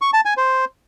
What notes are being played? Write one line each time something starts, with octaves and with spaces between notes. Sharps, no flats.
C#6
A5
G#5
C5